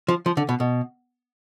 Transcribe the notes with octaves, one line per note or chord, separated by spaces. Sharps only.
F3
F3
D3
B2
B2